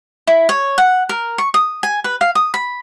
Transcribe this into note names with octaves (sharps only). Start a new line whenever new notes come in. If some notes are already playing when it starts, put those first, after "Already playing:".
E4
C#5
F#5
A#4
C#6
D#6
G#5
B4
F5
D#6
B5